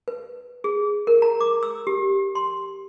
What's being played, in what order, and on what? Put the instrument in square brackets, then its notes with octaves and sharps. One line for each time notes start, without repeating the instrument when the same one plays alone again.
[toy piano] B4
G#4
A#4
A#5
D6
E6
G4
C6